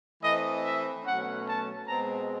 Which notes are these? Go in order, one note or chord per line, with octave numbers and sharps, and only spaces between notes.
E3 A3 C4 D#5
E5
B2 F#3 A3 C#4 F#5
A5
B2 G#3 C4 A#5